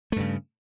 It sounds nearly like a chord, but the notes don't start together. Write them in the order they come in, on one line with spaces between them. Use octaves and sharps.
A3 G2 C#3